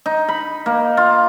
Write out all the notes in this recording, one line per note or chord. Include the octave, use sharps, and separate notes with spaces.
D#4
B5
A#3
F4